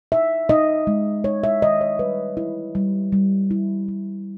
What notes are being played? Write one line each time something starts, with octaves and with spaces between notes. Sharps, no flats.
D#4 E5
D#4 D#5
G#3
D#4 C#5
E5
D#3 D#5
C#5
G3 B4
E4
G3
G3
E4
G3